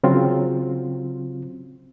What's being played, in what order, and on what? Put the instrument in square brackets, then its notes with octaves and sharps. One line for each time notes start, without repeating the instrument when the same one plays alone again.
[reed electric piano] C#3 F#3 C4 F4